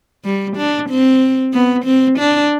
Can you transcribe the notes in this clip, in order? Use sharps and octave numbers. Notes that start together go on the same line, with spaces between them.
G3
D4
C4
B3
C4
D4